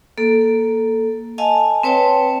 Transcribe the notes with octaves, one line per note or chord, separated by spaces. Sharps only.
A#3 A4
D#5 F5 G#5 A5
C4 B4 C#5 G5 A5